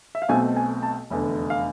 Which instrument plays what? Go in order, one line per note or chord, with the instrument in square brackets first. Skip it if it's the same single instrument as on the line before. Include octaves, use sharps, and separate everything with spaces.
[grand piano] E5
F5
B1 B2 A3 C4 G#5
G#5
A5
F1 E2 D3
F5